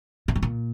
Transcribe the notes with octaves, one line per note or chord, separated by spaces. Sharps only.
A#2
G#2
A#2